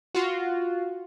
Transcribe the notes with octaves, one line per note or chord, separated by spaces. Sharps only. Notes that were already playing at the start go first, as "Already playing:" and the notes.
F4 F#4